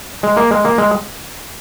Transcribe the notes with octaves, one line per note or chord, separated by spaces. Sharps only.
G#3
A#3
G#3
A#3
G#3